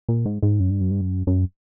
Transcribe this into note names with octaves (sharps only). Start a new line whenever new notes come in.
A#2
G#2
G#2
F#2
G2
F#2
G2
F#2
F#2